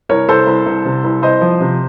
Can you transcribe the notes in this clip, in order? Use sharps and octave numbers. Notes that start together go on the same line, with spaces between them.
C2 A#4 C#5
C2 A4 C5
C2
C2
C3
C2
C2 C5 D#5
F3
C3